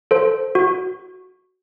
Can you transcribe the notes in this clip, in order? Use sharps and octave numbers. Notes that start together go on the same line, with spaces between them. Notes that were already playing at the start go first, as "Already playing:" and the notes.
A4 C5
F#4